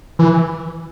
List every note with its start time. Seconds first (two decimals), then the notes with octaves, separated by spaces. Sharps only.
0.19 E3